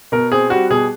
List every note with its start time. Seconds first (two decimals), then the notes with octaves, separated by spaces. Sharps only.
0.12 B2 A#4
0.32 C4 G#4
0.50 G3 F#4
0.70 B2 G#4